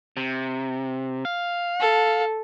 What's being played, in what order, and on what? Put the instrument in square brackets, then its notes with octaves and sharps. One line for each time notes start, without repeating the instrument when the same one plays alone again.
[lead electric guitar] C3
F5
[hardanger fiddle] A4